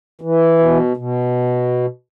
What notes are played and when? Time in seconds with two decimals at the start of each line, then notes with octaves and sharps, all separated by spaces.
0.21 E3
0.59 B2
0.97 B2